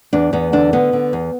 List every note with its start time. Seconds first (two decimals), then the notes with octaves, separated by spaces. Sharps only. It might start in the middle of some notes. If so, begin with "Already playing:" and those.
0.13 E2 D4
0.33 E2 B3
0.53 D3 D4
0.73 D3 B3
0.93 D3
1.13 E2